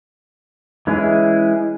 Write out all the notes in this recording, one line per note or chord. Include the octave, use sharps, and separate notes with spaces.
E3 G#3 C#4 E4 G#4